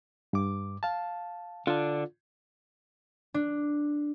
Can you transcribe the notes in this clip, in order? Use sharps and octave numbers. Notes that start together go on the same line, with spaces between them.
G2 D6
F5 A5
D3 D4 F4
D4